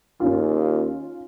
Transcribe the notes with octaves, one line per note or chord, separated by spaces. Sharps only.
D#2 C#4 D#4 F4